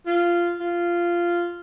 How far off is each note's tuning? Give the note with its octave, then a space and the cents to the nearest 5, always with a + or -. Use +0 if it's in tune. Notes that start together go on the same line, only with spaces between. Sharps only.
F4 -10
F4 -10